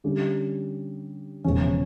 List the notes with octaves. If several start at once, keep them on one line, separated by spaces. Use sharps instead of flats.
D3 G3 C#4 G4
E1 E2 C#3 F3 C#4